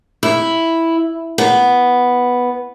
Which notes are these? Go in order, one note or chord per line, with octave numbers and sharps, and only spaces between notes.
E4
B3